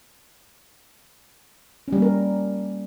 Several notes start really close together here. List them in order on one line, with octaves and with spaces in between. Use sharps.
C#4 G3 A#3 A#4